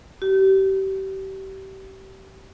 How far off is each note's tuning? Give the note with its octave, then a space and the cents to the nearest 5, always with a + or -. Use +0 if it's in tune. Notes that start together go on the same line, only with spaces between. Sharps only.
G4 -30